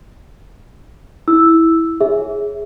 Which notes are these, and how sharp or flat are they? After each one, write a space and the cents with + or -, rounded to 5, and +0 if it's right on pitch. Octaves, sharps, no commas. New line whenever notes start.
E4 -10 E6 +0
G#4 +0 C#5 -10 E5 +0